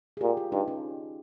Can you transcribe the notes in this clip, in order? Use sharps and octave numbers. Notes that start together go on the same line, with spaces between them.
G#4
A#2 G4
F4
G2 D#4
C#4